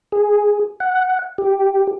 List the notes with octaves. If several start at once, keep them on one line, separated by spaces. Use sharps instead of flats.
G#4
F#5
G4